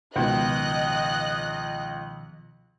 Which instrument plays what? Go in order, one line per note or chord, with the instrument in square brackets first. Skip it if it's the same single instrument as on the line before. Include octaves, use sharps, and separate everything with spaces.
[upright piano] C#2 [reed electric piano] B2 D#3 F3 [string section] D#5 F#6